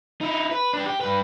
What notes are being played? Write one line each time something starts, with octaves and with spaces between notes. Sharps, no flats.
D#4 E4
B4
D4 B4
G4
G2 B4